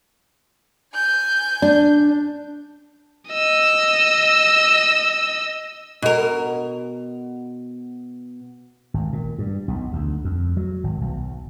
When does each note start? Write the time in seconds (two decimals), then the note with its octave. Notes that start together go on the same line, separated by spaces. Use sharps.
0.94 G#5 G6
1.62 D4
3.30 D#5 E6
6.02 B2 A#4
8.94 G#1
9.13 A#2
9.39 G2
9.68 B1
9.93 D2
10.24 F2
10.57 F#3
10.84 G#1
11.01 B1